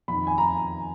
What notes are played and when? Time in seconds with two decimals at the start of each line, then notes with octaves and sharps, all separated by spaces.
0.08 F2 D#3 B5
0.27 G#5
0.38 A#5